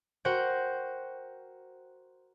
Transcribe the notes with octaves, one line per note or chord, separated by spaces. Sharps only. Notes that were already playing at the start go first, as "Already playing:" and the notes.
F#4 A#4 C5 F#5 G5